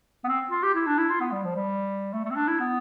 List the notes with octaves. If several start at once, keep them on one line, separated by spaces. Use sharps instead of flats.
B3
C4
F4
G4
E4
D4
E4
F4
B3
G3
F3
G3
A3
A3
C4
D4
E4
B3